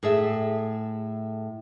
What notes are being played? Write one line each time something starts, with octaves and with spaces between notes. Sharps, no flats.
A2 G#4 A4 E5